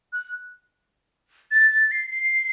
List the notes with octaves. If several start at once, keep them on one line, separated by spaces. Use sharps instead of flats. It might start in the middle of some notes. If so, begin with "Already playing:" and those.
F#6
A6
A6
C7
C7